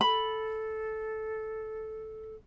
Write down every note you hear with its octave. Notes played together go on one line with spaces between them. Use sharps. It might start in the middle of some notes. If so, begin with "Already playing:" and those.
A4 B5